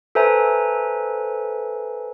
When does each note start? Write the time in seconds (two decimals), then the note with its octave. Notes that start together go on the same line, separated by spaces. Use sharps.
0.15 A4 B4 C5 E5 G#5 A#5